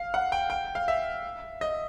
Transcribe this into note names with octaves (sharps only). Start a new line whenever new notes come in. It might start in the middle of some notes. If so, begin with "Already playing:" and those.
Already playing: F5
F#5
G5
G5
F5
E5
D#5